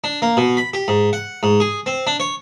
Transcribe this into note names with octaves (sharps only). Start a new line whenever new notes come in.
D4
A#3
B2
B5
G4
G#2
F#5
G#2
G#4
C4
D4
C#5